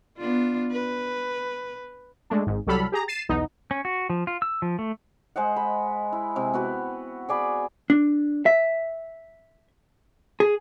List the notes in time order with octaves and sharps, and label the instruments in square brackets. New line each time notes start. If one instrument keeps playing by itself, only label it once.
[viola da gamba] B3 D4 F4
B4
[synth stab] G#3 A3 D4
G#1 G#2
C2 F#3 G3 A4 B5 F6
G4 G#4 A#5
A6 C7 D#7 E7
B1 E2 B3 D#4
[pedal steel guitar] C#4
F#4
F3
F4
E6
F3
A3
[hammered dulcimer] G#3 C5 D#5 F#5
B5
E4
C3 G#3
B3 F#4 B4
G#4 D5 G#5 B5
[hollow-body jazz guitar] D4
E5
G#4